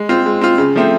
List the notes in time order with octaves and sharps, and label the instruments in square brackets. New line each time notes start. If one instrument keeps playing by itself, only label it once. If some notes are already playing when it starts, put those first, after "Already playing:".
Already playing: [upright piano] G#3
C4 F4
G#3
C4 F4
C#3
F3 A3 C4